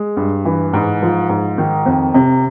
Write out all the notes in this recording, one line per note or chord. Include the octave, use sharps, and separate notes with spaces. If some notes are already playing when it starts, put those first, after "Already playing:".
Already playing: G#3
G2
E3
G#2
F3
G#2
D#3
F2
C3